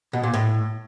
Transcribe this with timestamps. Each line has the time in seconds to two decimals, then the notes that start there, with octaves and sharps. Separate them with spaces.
0.13 B2
0.23 A#2
0.34 A2